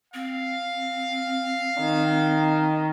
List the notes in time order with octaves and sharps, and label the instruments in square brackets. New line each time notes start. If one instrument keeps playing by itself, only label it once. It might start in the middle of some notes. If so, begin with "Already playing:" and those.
[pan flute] C4 [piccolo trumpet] F5
[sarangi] D#3